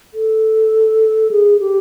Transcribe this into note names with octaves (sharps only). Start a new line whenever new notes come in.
A4
G#4
G4